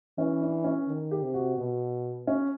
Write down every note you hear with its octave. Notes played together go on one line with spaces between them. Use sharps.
E3 C#4
D4
C#4
D#3
G4
C3
F#4
B2
C#4